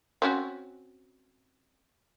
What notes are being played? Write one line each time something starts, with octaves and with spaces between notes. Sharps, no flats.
C4 C#4 F#4